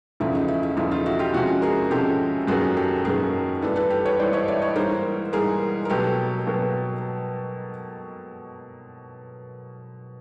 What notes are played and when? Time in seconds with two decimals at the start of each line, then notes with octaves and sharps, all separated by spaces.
0.20 E2 C#3 F3 A3 E4
0.35 D#4
0.48 E4
0.63 E4
0.77 E2 C#3 F3 A3 E4
0.91 D#4 F4
1.06 E4 F#4
1.19 F4 G4
1.33 C3 F3 G#3 C#4 E4 F#4
1.62 G#4 A#4
1.90 C3 F3 G#3 C#4 G4 A4
2.47 F#2 D#3 F#3 A#3 F#4 G#4
2.77 G4 A4
3.05 F#2 D#3 F#3 A#3 G#4 A#4
3.62 G2 E3 A3 D4 A4 B4
3.76 A4 B4
3.90 G4 A4
4.05 B4 C#5
4.19 G2 E3 A3 D4 C5 D5
4.33 C#5 D#5
4.48 D5 E5
4.62 C#5 D#5
4.76 G#2 E3 G3 A#3 A#4 C5
5.33 G#2 E3 G3 A#3 G#4 A#4
5.85 A#4
5.90 B2 F#3 A#3 G4 A4
6.47 B2 F#3 A#3